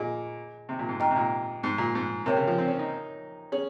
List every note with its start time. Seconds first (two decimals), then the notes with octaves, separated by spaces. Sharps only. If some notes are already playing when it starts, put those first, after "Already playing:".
Already playing: A#2 G#4 D#5 G#5
0.69 C3
0.79 A#2
0.89 G#2
1.00 G#2 D#5 G5 A#5 F6
1.11 C3
1.16 A#2
1.63 G#2
1.78 A#2
1.95 G#2
2.26 C3 A#4 C#5 G5
2.36 C#3
2.47 F3
2.58 C4
2.68 C#4
2.79 D#4
3.52 C#4 G#4